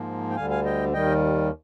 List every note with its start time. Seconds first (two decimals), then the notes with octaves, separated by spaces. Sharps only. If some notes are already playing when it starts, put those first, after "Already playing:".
Already playing: G#2 F3 A#3
0.30 G5
0.36 D2 D3 G3 F5 G#5
0.50 F5 G#5
0.65 D#5 G5
0.93 D#2 D#3 G3 D#5 G5